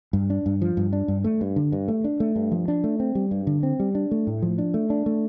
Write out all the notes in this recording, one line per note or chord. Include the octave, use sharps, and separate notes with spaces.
G2
D4
G2
F3
G2
D4
G2
A3
G2
D3
G2
A3
D4
A3
G2
F3
D4
A3
C4
G3
G2
D3
C4
G3
D4
A3
A2
F3
D4
A3
D4
A3